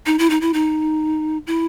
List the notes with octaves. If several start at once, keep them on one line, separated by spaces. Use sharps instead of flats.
D#4
E4
D#4
E4
D#4
E4